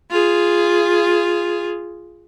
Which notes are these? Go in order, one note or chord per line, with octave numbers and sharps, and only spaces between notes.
F4 G#4